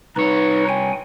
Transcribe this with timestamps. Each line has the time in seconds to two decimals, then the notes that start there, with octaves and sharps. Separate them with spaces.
0.16 C2 D#4 B4 C#5
0.69 G5 G#5